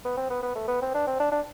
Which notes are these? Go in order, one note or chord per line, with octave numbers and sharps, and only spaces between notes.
B3
C4
B3
B3
A3
B3
C4
D4
C4
D4
D4